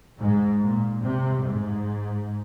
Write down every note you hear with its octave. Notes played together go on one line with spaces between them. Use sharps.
G#2
A#2
C3
G#2